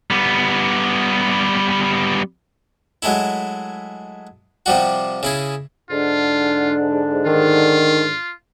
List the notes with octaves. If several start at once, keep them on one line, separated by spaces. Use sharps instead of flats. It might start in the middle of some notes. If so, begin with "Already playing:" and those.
G3 B3
F#3 G#3 A3 E4
C3 F3 G3 F#4
C#3 E4 G#4
G#2 D3 D4 F4
D#3 F4